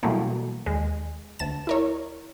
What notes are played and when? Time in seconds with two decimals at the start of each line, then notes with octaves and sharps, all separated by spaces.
0.03 B2 E3 F#3 G3 A3 A#3
0.66 D#2 G#3
1.39 D2 A5 E7
1.67 E4 A#4 C#5